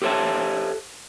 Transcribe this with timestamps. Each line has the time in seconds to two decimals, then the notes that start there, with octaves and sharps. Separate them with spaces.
0.02 G4 A4 C5 C#5 E5 A5